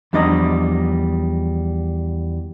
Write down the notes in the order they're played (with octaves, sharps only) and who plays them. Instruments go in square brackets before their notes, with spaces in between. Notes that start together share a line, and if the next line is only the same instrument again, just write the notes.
[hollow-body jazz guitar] E2 F3 G3 D4 D#5 A#5